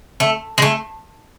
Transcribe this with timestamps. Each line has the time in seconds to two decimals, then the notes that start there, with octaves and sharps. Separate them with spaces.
0.20 A3
0.58 G#3
0.62 A3